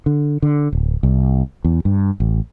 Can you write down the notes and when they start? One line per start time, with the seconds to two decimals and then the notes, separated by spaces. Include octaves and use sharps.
0.06 D3
0.42 D3
0.73 D1
1.03 C2
1.64 E2
1.85 G2
2.20 A1